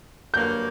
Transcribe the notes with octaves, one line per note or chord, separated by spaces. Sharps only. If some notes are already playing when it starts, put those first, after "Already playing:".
G2 D3 F#3 A#3 G6